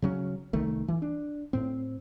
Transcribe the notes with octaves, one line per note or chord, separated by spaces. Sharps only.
C#3 F#3 C#4
C2 D#3 A3
E3
D4
A2 C4